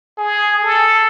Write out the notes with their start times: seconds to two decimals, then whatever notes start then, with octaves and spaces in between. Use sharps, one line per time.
0.18 G#4
0.63 A4